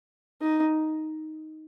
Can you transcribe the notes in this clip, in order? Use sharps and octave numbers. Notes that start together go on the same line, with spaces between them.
D#4